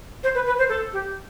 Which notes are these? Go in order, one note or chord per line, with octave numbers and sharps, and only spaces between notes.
C5
B4
B4
C5
A4
G4